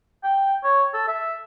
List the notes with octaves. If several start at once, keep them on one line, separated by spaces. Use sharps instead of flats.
G5
C#5
A4
E5